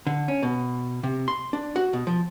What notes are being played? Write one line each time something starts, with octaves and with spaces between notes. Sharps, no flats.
D3
C#4
B2
C3
C6
D4
F#4
B2
F3